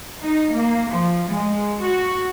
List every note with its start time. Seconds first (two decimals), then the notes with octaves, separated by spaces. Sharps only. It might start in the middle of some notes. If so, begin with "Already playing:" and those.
0.21 D#4
0.52 A#3
0.90 F3
1.30 G#3
1.79 F#4